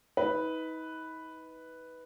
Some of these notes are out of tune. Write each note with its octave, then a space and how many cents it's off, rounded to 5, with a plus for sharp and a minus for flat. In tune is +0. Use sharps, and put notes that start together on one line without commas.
D#4 +40 B4 +0